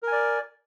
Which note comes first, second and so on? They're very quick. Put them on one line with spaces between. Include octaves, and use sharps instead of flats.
A#4 G#5 D5